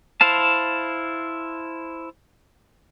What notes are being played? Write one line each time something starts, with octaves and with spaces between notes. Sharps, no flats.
E4 C5 F5 A5